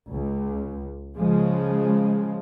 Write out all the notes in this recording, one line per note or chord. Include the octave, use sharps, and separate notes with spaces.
C#2
C#3 F3 G#3